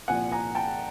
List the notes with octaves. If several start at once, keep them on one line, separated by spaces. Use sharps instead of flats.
C2 A#2 F3 F#5 G#5
G#5 A#5
G5 A5